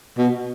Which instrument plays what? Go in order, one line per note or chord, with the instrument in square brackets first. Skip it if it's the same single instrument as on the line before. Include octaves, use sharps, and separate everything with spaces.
[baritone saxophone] B2